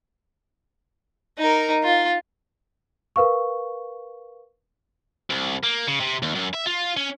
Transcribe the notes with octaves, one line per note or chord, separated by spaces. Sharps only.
D#4 A#4
F4
A#4 B4 F5 C#6
C2
A#3
C#3
C3
D#2
F#2
E5
F4
C#4